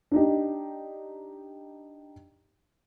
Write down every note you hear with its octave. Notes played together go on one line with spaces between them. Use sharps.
D4 D#4 G4